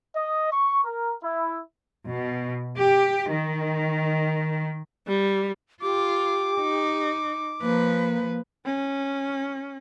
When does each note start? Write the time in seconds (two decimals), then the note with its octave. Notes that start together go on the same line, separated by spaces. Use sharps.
0.14 D#5
0.51 C#6
0.84 A#4
1.22 E4
2.07 B2
2.78 G4
3.31 D#3
5.08 G3
5.82 F4 G4 D6
6.60 D#4
7.62 F3 A#3 B4
8.66 C#4